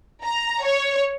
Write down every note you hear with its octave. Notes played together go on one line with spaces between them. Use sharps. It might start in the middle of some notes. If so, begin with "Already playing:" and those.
A#5
C#5